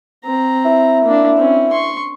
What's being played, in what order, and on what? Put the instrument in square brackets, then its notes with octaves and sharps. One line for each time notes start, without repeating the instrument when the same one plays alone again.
[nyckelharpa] C4 A#5
[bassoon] E4
[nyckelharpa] A#3 D4
C4 C#4
C6 C#6